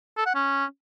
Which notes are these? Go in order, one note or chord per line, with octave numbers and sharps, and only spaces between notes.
A4
F#5
C#4